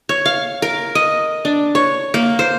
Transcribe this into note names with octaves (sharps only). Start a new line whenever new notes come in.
C#5
F5
A#4
D#5
D4
C#5
A#3
C5